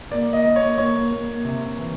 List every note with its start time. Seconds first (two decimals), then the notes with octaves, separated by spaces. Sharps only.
0.11 A#3 D5
0.33 D#5
0.45 A#3
0.56 C#5
0.78 A#3 C#5
1.11 A#3
1.45 C3
1.78 E3